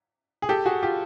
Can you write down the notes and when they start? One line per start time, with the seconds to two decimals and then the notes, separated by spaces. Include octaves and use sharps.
0.42 G#4
0.49 G4 A4
0.66 F#4 G#4
0.82 F4 G4